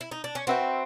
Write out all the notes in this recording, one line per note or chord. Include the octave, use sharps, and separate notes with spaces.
E4
D#4
D4
C#4
C4 F#4 B4 E5 G5